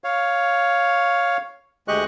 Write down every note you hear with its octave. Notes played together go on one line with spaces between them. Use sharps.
C#5 F5
D2 G#3 G4 D#5 C#6 F#6